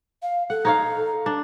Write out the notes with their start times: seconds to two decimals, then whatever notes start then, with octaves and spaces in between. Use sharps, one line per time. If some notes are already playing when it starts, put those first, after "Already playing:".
0.22 F5
0.50 A4 F#5
0.65 D#4 C#5 F5
1.26 D4